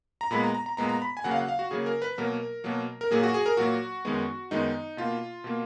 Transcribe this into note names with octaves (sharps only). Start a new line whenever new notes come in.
A#5
A#2 G#3 B3 B5
A#5
A#5
A#5
A#2 G#3 B3 A#5
A#5
B5
G#5
C#3 F#3 A#3 F#5
F5
F#5
F5
F#4
C#3 F#3 A#3 G#4
A#4
B4
B2 F#3 A#3 A#4
B2 F#3 A#3
A#4
A#2 F#3 A#3 G#4
F#4
G#4
A#4
A#2 F#3 A#3 F#4
F#2 D#3 G#3 B3
F#2 D#3 G#3 B3 D#4
B2 A#3 F4
B2 A#3